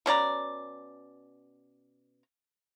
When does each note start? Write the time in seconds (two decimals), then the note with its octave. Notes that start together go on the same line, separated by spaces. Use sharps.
0.06 B2 C#4 D5 A#5